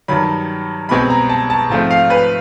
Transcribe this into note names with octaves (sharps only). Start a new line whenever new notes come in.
G2 D#3 F#3 B5
C2 B2 G#3 C4 B5
A#5
A5
A5
G#2 F3 A3 C4
F5
B4